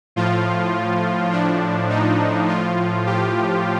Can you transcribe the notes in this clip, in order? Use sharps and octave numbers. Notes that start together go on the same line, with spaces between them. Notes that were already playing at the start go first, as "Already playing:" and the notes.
A2 F3 F4
A2 F3 D4
D#4
A2 F3 F4
G4